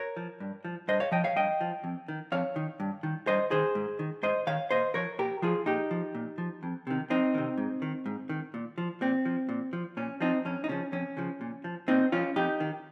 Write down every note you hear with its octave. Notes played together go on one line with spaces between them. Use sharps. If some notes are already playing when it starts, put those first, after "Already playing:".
Already playing: A#4 C#5
F3
G2
F3
G2 C5 D#5
C#5 F5
F3 D#5 G5
C#5 F5
G2 D#5 G5
F3
F2
D#3
F2 C#5 F5
D#3
G2
D#3
G2 C5 D#5
D#3 G#4 C5
G#2
D#3
G#2 C5 D#5
D#3 C#5 F5
A#2 C5 D#5
F3 A#4 C#5
A#2 G4 A#4
F3 F4 G#4
A#2 D#4 G4
F3
A#2
F3
F2
C3 D#3
F2 C4 D#4
C3 D#3
G#2
D#3
G#2
D#3
A#2
F3
A#2 C4
F3
A#2
F3
A#2 C#4
F3 C4 D#4
F2 C#4
D#4
C#3 F3 C#4
F2 C#4
C#3 F3
A#2
F3
A#2 C4 D#4
F3 C#4 F4
F2 D#4 G4
D#3